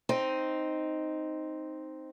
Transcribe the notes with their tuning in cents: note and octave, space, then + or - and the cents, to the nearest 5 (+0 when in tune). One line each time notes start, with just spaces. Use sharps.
C4 +0 D#4 +0